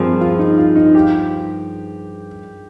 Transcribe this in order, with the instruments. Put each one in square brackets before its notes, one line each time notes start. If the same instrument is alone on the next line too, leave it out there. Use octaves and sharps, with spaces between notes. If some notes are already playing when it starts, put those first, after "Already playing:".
Already playing: [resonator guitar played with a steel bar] G2 F3 C4 [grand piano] G#4 A#4
[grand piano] F4
D#4
F4
D#4
G4